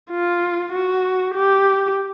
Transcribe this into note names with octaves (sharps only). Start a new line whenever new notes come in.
F4
F#4
G4